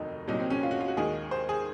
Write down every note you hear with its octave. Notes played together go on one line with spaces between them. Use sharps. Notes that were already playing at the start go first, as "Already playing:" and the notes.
Already playing: F1 D#2 D#3 F#3 D#4
C2 A#2 F#3 D#4
C4
C#4
F4
F#4
F4
F#4
D#2 D#3 G#3 G#4
C5
G#4